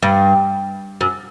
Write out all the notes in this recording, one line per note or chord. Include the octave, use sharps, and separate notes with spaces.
G2
F#2